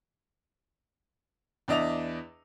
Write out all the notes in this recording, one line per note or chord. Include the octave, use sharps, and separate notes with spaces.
E2 D4 D#5 E5 F7